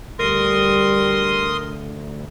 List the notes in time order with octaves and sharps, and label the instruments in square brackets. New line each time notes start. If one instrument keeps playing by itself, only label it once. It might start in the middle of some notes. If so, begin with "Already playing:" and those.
[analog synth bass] D2 [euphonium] G3 [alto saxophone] A#4 [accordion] C6 D#6